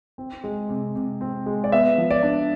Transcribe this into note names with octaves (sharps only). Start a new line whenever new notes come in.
C4
G#3
C3
C3
C4
G#3
D5
B3 E5
F3
D5
D4